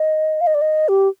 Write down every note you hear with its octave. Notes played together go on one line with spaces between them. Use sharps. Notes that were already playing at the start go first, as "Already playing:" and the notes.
Already playing: D#5
F5
D#5
D5
D#5
G4